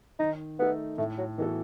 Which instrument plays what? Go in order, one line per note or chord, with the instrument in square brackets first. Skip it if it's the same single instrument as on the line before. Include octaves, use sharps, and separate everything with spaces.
[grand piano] D#3 [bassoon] D#4
[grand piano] A3 D#4 A4 [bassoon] B3
[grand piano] A2 [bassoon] A3
[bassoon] F#3
[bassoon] D#3 [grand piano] E3 B3 F#4 A4